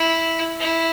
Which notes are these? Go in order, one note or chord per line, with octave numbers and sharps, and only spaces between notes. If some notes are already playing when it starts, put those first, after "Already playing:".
Already playing: E4
E4